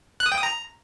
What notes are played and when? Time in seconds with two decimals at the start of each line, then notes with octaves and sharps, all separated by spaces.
0.20 F#6
0.26 D#6
0.32 G5
0.37 D#6
0.43 A#5